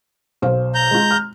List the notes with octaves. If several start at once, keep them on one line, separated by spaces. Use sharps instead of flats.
B1 C5 F5
A#5 G6
G#3 F4
F6